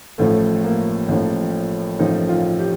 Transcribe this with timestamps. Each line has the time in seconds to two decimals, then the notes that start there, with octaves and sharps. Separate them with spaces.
0.18 A1 A2 F3 A3
0.64 A#3
1.08 A1 A2 F3
1.99 A1 A2 F3 D#4
2.29 F4
2.59 G4